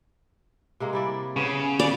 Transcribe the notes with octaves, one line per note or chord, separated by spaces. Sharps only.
C3 G#3 A#3
G3 E4 D5
C#3 B3
D5